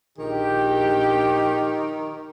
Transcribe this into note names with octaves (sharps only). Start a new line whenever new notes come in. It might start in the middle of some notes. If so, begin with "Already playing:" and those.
A#1 D#3 G4